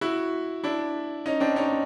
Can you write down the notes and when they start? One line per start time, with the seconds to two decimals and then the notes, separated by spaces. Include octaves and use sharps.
0.01 E4 F#4
0.64 D4 E4
1.26 C#4 D#4
1.40 C4 D4
1.56 C#4 D#4